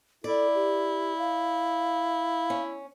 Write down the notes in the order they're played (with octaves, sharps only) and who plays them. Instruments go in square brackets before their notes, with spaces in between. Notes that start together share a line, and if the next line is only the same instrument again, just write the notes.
[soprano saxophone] E4 [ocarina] A4 [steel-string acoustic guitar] D5
[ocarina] G4
F5
[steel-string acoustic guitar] C#4